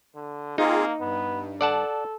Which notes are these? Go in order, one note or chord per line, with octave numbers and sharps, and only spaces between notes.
D3
A#3 C4 D#4 F4 G#4
G2 B3
A4 D5 F#5 A5